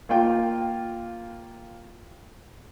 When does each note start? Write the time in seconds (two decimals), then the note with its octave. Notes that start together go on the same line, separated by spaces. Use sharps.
0.09 A#3 F4 G5